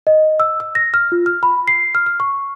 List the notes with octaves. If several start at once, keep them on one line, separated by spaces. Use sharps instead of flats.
D#5
E6
E6
A#6
F6
F4
F6
B5
C7
F6
F6
C#6